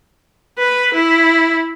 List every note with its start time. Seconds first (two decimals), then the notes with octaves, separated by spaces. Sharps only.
0.58 B4
0.94 E4